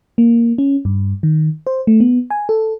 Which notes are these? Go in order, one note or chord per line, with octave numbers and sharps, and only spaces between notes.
A#3
C#4
G2
D#3
C5
A3
B3
G#5
A4